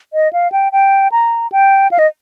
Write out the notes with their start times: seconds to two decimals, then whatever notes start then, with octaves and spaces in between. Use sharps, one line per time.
0.13 D#5
0.33 F5
0.52 G5
0.72 G5
1.12 A#5
1.52 G5
1.91 F5
1.99 D#5